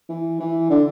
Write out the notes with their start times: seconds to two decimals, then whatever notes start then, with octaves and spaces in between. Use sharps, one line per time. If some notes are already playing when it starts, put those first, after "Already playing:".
0.09 E3
0.40 E3
0.70 D3